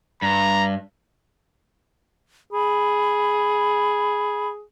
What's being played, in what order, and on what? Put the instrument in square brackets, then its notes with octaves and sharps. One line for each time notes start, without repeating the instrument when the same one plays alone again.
[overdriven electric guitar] G2 [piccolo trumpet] A#5
[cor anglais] G#4 [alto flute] B5